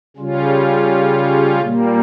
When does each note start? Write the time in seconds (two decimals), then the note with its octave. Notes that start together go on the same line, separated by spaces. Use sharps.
0.17 C#3 G3 C#4 F4
1.61 A#2 G3 A#3